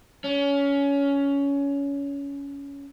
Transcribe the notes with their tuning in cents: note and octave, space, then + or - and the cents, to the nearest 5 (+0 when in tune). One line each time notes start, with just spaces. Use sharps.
C#4 +20